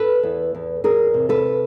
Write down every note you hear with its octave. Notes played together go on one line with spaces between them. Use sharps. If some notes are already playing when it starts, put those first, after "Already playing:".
Already playing: A4 B4
E2
E2
E2 G#4 A#4
C3
A4 B4